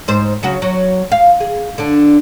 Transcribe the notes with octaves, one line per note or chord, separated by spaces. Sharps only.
G#2 C5
C#3 F#3 F#4
F#3
F5
G#4
D3 D4